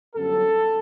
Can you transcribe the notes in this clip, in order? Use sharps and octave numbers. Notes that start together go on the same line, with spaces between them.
G1 F#2 F#3 A4